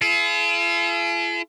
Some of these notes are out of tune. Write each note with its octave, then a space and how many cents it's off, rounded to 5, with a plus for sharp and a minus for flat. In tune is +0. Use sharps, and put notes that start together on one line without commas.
F4 -45 G#4 +45